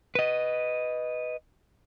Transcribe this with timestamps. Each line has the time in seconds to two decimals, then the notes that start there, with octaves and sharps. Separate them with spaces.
0.15 B4 D#5